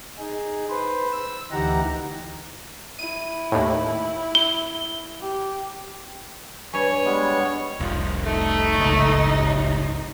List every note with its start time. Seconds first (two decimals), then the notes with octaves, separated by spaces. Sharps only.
0.19 D#4 G#4
0.70 B4 C5
1.12 E6
1.52 D2 E3 D#4 G4 F#5 A#5
2.99 E4 D#7
3.52 D#2 A2
4.35 G7
5.20 G4
6.73 G2 C#5 G#5
7.05 G3 G#3 B3
7.79 F1 C2 D#3 F3
8.25 A3 D#4
8.78 D1 G1 C#2
9.30 F#2 C3